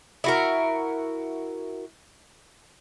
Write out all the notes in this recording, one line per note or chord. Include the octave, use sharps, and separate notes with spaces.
E4 F#4 A#4